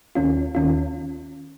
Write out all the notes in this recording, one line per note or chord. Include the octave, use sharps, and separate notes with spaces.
D#2 D#3 C#4 F4
D#2 D#3 C#4 F4